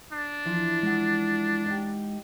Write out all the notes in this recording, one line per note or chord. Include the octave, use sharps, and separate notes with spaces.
D4
E3 F3 E4
G#3 F#5
D#4 G4